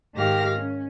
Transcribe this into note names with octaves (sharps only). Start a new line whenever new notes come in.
G#2 D#3 G4 A#4 F5 A#6
C#4